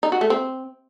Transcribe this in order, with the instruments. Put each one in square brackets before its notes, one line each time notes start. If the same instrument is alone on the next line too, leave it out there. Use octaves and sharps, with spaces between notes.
[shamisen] D#4
F#4
A3
C4